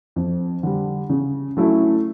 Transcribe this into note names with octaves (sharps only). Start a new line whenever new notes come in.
F2
D3 G3
C#3
F#3 A3 C#4 E4